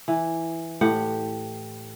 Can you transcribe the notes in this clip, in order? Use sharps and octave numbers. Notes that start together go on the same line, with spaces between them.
E3
A2 G4 F#5